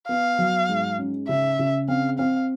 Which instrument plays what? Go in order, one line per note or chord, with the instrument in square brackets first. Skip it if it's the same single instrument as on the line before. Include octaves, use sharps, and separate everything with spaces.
[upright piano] B3 [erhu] F5
[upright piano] F#3
G#2
C#4
[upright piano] C#3 [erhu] E5
[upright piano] C#3
[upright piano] C4 [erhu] F5
[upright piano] C4 [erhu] F5